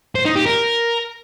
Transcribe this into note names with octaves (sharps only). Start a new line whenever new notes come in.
C5
D#4
G4
A#4